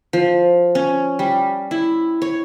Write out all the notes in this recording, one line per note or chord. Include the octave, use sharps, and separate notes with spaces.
F3
C#4
G3
E4
C#5